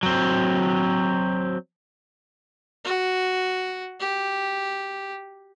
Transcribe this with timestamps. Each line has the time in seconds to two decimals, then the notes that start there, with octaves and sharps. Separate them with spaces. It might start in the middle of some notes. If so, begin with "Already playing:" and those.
0.03 F#3 C4
2.84 F#4
4.00 G4